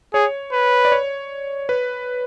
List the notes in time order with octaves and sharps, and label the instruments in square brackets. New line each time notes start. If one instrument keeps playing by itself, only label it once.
[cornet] G#4 [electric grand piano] C#5
[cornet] B4
[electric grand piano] D5
C#5
B4